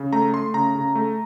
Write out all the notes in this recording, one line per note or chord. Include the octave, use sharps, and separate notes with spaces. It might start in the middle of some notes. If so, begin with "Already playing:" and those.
Already playing: C#3
A3 A#5
A3 C6
C#3 A#5
C#3
A3